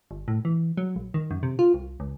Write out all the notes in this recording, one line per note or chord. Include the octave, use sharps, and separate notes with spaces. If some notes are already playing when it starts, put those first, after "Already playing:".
G1
A2
E3
F#3
A#1
D#3
F#2
C3
F4
C2
C#2